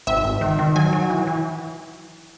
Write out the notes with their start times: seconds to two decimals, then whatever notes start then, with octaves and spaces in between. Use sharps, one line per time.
0.07 G#1 E5
0.24 G#1
0.41 D#3
0.59 D#3
0.76 F#3 G#5
0.93 F#3
1.10 E3
1.27 E3